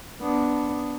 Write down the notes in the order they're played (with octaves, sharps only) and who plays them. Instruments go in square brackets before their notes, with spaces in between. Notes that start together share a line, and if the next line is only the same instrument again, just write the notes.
[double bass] B3 D4